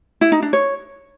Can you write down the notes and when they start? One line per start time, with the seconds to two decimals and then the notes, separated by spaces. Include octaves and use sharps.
0.21 E4
0.32 D#4
0.42 D4
0.53 C#5